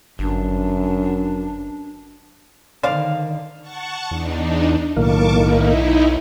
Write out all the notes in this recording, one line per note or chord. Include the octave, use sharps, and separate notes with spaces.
G1 F#2 D4
D3 D#3 C5 D5 F5
F#5 A5 C#6
E2 D4 D#4
B1 A2 D#3 A#3 A5 C#6 D6
D#4 E4